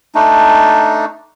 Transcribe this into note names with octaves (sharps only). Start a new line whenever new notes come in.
A3 D4 D#4